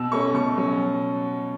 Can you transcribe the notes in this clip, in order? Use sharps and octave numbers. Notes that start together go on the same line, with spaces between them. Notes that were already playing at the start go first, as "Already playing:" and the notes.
Already playing: B2 E6
A3 C#4 C#6
B2 C#6
F#3 C#4